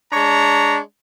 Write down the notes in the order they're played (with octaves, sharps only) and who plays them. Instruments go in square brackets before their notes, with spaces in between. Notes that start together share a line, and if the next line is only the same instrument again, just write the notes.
[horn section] G#3 D4 C#5 A#5